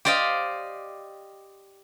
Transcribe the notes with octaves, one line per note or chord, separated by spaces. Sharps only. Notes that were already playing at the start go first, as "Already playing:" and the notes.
G4 C5 D5 D#5 F5 G5